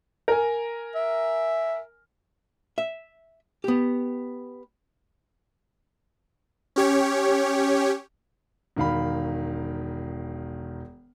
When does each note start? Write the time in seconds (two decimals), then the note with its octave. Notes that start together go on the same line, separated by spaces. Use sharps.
0.28 A#4 G#5
0.95 E5
2.78 E5
3.64 B3 G4
6.76 C#4 G4 C#5
8.76 E1 D#3 F5 B5